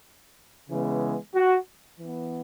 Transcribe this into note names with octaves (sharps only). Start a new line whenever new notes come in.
C#3 E3 G#3 B3
F#4
E3 B3